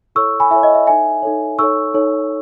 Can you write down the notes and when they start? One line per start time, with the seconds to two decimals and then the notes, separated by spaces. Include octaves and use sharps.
0.15 E4 A4 C#5 C#6 E6
0.40 G#5 B5
0.51 E4 A4 C#5 E5 G#5
0.63 D#5
0.75 E5
0.87 D#4 A4 C#5 E5 G#5
1.22 D#4 A4 C#5
1.59 D#4 A4 C#5 C#6 E6
1.94 D#4 A4 C#5